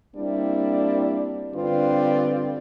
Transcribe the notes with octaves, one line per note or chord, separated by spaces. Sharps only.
G3 A#3 C4 D4 E4 D5
G2 D3 C4 F4 B4 D5